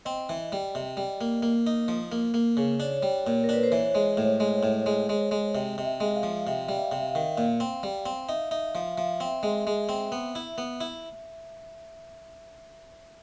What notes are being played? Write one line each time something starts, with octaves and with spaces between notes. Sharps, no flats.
C4 D#5
E3
G3
C3
G3
A#3
A#3
D#4
F3
A#3
A#3
C#3
D4 C#5
G3
A#2
A#4
D4 B4
C5
E3 C#5
G#3
A2
G#3
A2
G#3
G#3
G#3
C3 D#5
C3
E5
G#3
F5
F3
C3 E5
G3
E5
F5
C3 E5
F5
D#3
A#2
C4
G3
C4
D#4 E5
D#4 E5
F3 F5
F3 E5
C4 E5
G#3
G#3
C4
B3
E4
B3
E4